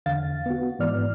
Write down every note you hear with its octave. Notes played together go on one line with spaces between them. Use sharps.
E2 D3 F5 A6
B3 F#4
G#2 E3 B3 D5 F6